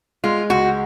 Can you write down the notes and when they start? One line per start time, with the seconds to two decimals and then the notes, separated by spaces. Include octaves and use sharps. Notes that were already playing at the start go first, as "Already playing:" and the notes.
0.24 G#3 F4
0.50 C#2 F#4